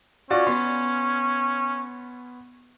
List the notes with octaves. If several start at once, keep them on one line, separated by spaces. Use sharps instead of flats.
C#4 F4 F#4 D5
B3 C6